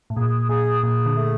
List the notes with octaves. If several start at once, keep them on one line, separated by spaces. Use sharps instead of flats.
A2
A#2 G#4
A#2 G#4
A#2 G#4
D3
A3